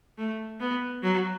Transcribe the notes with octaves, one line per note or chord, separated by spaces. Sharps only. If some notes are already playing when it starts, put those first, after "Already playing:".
A3
B3
F#3